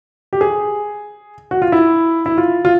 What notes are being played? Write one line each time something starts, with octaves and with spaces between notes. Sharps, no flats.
G4
G#4
F#4
F4
E4
E4
F4
F4